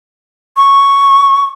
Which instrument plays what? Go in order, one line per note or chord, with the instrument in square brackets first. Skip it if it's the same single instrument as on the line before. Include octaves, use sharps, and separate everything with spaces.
[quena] C#6